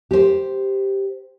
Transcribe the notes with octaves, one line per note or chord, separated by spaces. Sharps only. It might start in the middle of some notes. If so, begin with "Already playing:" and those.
G4 C5